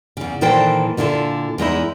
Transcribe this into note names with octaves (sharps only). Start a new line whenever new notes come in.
E2 C#3
A#2 D#3 E3 A4 C5 G5
A#2 D3 E4 F4 A4
E2 G#3 D#4 E4